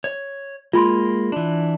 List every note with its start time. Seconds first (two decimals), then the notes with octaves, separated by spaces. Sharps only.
0.04 C#5
0.73 G#3 A#3 F4 B5 C6
1.32 E3 D4